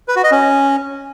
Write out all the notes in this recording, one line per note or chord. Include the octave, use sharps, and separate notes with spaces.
B4
F#4
D#5
C#4